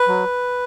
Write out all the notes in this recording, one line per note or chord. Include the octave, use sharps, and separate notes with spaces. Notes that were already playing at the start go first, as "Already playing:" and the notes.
Already playing: B4
F#3